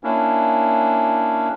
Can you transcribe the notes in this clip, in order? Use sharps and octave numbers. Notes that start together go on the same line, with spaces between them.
A#3 C#4 D4 E4